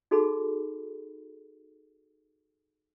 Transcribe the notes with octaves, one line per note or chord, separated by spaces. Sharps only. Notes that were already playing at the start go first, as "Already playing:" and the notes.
D#4 F#4 G#4 A4 B5